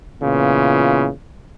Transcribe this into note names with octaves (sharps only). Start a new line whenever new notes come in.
A#2 C#3 E3 B3 F4